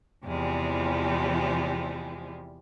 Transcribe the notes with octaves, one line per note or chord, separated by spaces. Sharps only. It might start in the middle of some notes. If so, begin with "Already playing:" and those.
E2 C3 E3 F3 G3 G#3